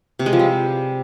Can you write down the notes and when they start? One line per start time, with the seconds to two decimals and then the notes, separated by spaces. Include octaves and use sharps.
0.19 C3
0.26 G#3
0.33 F3
0.39 G3